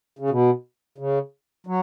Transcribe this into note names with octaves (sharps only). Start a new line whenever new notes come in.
C#3
B2
C#3
F#3